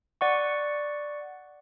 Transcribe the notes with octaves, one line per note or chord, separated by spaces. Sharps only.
D5 F#5 C#6